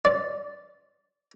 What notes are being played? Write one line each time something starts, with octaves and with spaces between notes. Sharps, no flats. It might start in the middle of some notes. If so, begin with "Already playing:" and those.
D5